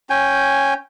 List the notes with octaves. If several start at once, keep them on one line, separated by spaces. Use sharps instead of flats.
C#4 G5 G#5